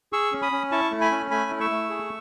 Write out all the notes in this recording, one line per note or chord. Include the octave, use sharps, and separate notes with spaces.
G#4 C#6 E6
C#4
B5 D#6
C#4
E4 A5 C#6
A3
G#5 B5
C#4
A3 G#5 B5
E4
C#6 E6
A3
G#4